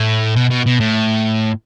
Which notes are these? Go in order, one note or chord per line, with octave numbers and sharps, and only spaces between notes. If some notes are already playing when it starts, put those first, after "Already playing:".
Already playing: A2
B2
B2
B2
A2